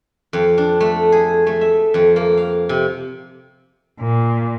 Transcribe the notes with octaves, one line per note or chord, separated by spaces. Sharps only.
F2
D4
A3
G#4
A3
E5
F2
A#3
F5
C3
A#2